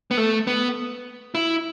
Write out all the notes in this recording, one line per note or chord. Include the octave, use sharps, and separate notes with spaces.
B3
A3
B3
E4